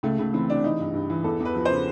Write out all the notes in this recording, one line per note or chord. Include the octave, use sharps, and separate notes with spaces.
C#2 A3
C#2 A3
E3 C4
C3 D4
E3 D#4
G2
G2
E3
E2 A4
E2
B4
F3
C#3 C5